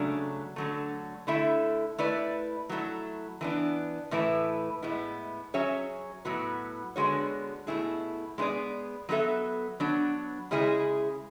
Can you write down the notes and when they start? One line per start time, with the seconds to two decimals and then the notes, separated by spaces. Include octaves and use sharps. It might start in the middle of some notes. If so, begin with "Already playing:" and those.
Already playing: C#3 F#3 A3 D4
0.56 D3 F#3 A3
1.27 D3 A3 E4 A4 E5
1.98 A3 E4 B4 D5
2.69 F#3 A3 E4
3.41 E3 B3 D4
4.11 A2 E3 A3 E4 B4
4.82 A2 G#3 B3 E4
5.54 F#3 C#4 G#4 C#5 E5
6.25 A2 F#3 B3 F#4 B4
6.96 D3 G#3 B3 F#4 C#5
7.67 B2 A3 E4 G#4
8.38 G#3 B3 D4 G#4 D5
9.09 F#3 B3 F#4 A4 E5
9.80 F#3 B3 D4
10.51 C#3 G#3 C#4 E4 G#4